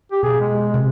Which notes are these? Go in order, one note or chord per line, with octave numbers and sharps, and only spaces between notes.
G4
B2 G#4
G#3
C3